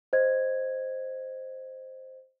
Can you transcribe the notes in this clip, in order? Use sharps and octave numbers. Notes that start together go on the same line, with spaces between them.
C5 D#5 G#6